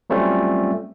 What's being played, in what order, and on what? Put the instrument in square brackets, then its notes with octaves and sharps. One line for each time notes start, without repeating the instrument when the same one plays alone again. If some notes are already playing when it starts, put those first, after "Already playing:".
[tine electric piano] F#3 G3 A3 C4 C#4 F4